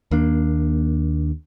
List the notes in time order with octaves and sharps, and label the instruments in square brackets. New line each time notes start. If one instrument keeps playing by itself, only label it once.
[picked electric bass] D#2 A#3 D4